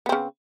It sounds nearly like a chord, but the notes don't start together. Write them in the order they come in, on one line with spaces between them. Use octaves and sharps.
B3 C4 C#3